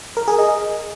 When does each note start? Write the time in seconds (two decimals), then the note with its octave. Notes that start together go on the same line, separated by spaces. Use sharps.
0.17 A#4
0.28 G#4
0.38 D#5